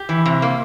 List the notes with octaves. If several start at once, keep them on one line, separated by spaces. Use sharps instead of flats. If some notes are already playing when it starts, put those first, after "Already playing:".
Already playing: G4
E3
C3
A#3